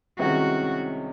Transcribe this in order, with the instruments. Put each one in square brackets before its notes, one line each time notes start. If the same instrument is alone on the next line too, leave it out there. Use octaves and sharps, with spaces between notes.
[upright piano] C2 C3 D#3 G#3 C#4 [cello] F#4